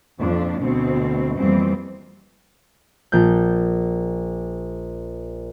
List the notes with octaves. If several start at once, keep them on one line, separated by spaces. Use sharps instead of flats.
F2 A#2 D4
D2 B2 C4
F2 B2 E3 G3 A#3 C4
A#1 G6